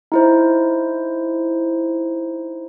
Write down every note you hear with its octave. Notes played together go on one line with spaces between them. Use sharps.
D#4 E4 C5